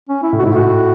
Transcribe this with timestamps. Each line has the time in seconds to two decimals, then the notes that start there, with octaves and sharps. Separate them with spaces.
0.09 C#4
0.23 E4
0.33 A2
0.39 F#4
0.43 G#2 E4
0.53 A2 F#4